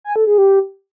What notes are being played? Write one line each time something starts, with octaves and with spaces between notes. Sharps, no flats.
G#5
A4
G#4
G4